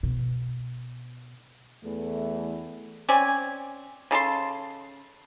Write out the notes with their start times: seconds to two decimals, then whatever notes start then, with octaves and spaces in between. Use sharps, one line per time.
0.03 B2
1.84 E2 E3 A3
3.09 C4 C#4 D5 G#5
4.11 C#3 A4 A5 C6